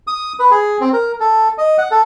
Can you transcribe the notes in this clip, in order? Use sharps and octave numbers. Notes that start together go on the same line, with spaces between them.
D#6
B4
G#4
C4
A#4
A4
D#5
F#5
A4